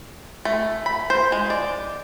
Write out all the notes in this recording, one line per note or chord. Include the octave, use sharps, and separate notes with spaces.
A3
B5
C5
G#3
D5